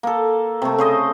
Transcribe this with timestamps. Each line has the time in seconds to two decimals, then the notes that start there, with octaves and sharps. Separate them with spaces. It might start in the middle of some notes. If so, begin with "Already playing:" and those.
0.03 A#3 A4
0.62 C3 A3
0.78 C#3 C5 D#5